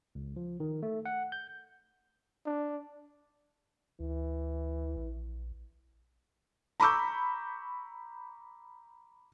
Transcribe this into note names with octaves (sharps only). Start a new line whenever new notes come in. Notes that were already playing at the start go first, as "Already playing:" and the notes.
C#2
F3
D#3
A3
F#5
G6
D4
D2 E3
A#1
A#5 B5 C#6 D6 E6 G6